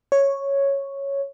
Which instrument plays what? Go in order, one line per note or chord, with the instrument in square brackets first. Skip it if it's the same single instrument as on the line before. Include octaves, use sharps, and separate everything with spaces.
[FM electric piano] C#5